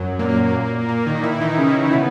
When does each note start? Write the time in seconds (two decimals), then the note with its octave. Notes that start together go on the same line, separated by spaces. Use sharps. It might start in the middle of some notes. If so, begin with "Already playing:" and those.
Already playing: F#2 F#3
0.19 A#2 A#3
0.89 A#2 A#3
1.06 D#3 D#4
1.23 E3 E4
1.40 D#3 D#4
1.58 C#3 C#4
1.92 B2 B3